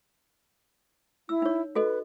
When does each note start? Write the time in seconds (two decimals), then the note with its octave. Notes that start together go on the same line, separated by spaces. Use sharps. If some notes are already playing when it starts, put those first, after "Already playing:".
1.29 E4 E6
1.42 D#4 C#5
1.75 F#4 A4 B4 D#5